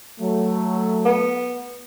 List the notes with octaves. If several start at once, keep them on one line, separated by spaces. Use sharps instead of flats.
F#3 A3
B3